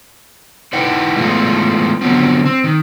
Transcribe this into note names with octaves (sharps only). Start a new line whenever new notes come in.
D#4 E4 B4 F#5 G5
A2 E3 G#3 A3 B3 F4
D3 F3 F#3 B3 C4
C4
D#3